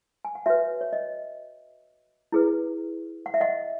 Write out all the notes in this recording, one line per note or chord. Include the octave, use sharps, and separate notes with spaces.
G#5
F#5
F#4 B4 C#5 E5
C#5
D#5
E4 G#4 B4
F#5
E5
D#5 F#5